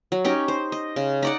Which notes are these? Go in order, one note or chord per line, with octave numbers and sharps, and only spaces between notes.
F#3
C#4 D#4 G4
C5
D#5
C#3
D#4 D5 F#5